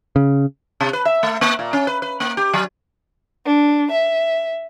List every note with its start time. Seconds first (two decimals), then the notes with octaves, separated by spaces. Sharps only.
0.16 C#3
0.81 C3
0.93 B4
1.05 E5
1.23 A3
1.41 A#3
1.59 A#2
1.73 C#4
1.87 B4
2.02 B4
2.20 A#3
2.37 G4
2.54 F#3
3.46 D4
3.92 E5